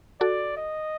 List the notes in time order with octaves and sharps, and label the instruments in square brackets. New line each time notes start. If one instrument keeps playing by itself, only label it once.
[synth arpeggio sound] F#4 A4 [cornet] D5
[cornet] D#5